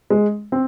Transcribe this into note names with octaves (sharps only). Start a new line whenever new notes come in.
G#3
C4